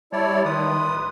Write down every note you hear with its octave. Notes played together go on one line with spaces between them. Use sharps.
G3 E4 C#5 D5 A5
D#3 B4 C6 D#6
D1